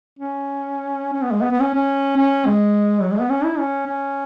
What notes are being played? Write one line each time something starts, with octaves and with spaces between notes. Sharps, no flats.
C#4
C#4
B3
G#3
B3
B3
C#4
C#4
C#4
G#3
F#3
G#3
B3
C#4
E4
C#4
C#4